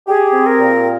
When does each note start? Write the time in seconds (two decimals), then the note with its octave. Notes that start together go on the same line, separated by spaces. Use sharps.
0.07 G4 G#4
0.33 C4
0.46 A#4
0.59 A#2